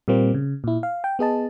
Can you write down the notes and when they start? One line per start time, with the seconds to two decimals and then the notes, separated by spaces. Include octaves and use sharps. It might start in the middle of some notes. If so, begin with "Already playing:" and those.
0.08 A#2 G3 A#3 C4
0.34 C#3
0.64 A#2 E4
0.83 F5
1.04 G5
1.19 B3 G#4 D#5 A5